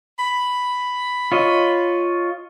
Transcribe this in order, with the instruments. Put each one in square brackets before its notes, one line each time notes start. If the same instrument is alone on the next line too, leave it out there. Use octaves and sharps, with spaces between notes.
[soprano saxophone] B5
[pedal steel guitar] F4 C#5 D#5